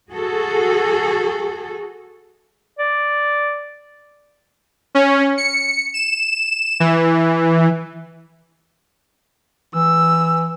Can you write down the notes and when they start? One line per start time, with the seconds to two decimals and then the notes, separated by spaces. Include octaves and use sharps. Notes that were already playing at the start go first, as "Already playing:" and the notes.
0.11 F#4 G#4 A4
2.79 D5
4.95 C#4
5.38 C#7
5.94 E7
6.80 E3
9.75 E3 E6